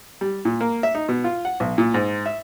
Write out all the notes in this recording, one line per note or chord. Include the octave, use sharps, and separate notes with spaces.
G3
A#2
A#3
E5
D#4
B2
F4
F#5
B1
A#2
G#2
E5